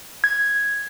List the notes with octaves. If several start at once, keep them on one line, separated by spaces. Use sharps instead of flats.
G#6